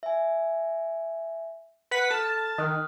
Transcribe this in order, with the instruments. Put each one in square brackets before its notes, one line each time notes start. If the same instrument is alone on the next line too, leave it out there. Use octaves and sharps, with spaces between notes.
[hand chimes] E5 G#5
[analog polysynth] B4 F#5 B6
[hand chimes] A4 F6 [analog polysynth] A5
[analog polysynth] D#3 [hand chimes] D#6 F6 F#6